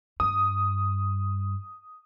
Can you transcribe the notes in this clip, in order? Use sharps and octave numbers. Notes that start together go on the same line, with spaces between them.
G2 D#6